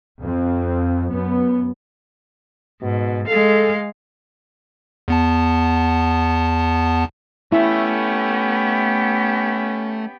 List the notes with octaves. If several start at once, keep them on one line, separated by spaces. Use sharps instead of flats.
F2 C4
F#2 B3
G#2 B2
G#3 A4 F5
E2 B3 A5
A3 B3 C#4 E4 G4 E5